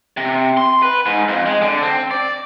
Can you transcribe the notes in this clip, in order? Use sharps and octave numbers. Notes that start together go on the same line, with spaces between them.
C3
C6
B4
G#2
F2
G#3
D3
C4
D5